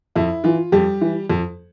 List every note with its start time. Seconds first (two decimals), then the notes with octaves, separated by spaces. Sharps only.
0.16 F2 E4
0.44 E3 F4
0.72 F2 G3 G4
1.01 E3
1.30 F2